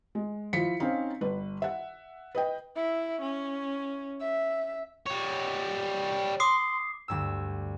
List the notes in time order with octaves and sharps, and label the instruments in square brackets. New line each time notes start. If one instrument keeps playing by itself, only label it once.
[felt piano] G#3
F3 E4 F4 B6 C#7
C4 C#4 D#4 F5
G1 B4
E5 F#5
B4 D#5 G5
[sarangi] E4
C#4
E5
[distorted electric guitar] G3 C#5
[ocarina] C6 [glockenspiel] D6 D#6 C7
[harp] D2 G2 E6